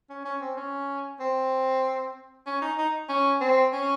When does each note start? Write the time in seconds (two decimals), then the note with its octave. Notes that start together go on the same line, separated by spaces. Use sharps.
0.10 C#4
0.25 C#4
0.41 C4
0.57 C#4
1.20 C4
2.46 C#4
2.62 D#4
2.78 D#4
3.09 C#4
3.41 C4
3.73 C#4